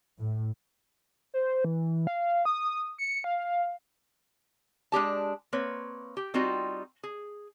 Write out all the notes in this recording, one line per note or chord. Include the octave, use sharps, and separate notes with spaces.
A2
C5
E3
F5
D#6
C#7
F5
G#3 D4 G4 A5
A#3 C4 B4 C#5
G4
G3 C4 D#4 F4 F#4
G#4